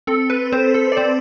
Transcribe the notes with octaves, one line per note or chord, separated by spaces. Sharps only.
C4 A4
B4
C4 C5
A4
D5
C4 C5